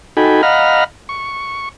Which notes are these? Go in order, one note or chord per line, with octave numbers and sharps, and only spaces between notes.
D#4 F#4 A4 G5 G#5 B5
D#5 F5 F#5 A#5 B5 F6
C#6